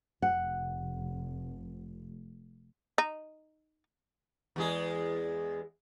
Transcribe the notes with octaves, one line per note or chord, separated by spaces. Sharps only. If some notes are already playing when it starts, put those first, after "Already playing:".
F1 F#5
D#4
E2 G#3 G#4